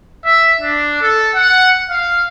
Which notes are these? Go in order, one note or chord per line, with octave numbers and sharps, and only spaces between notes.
E5
D4
A4
F#5
F5